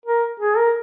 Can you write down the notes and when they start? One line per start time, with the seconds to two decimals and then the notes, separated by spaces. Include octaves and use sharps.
0.06 A#4
0.40 G#4
0.57 A#4